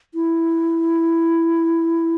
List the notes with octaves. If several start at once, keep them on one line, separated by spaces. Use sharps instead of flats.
E4